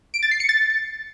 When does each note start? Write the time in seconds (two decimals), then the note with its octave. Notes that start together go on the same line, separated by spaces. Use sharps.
0.14 D7
0.23 A6
0.31 C7
0.40 C#7
0.49 A6